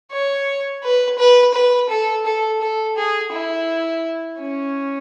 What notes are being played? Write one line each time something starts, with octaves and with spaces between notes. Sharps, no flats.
C#5
B4
B4
B4
A4
A4
A4
G#4
E4
C#4